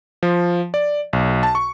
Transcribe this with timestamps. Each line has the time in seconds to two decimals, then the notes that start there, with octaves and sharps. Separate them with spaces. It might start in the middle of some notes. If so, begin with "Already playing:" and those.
0.23 F3
0.74 D5
1.13 B1
1.43 A5
1.55 C#6